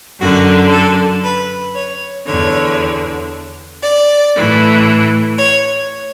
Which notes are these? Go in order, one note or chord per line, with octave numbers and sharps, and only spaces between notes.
F#2 D3 F#4
A4
B4
C#5
E2 D3 C#5
D5
A2 E3
C#5